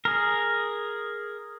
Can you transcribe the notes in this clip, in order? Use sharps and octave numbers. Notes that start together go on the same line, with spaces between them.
G#4 A#4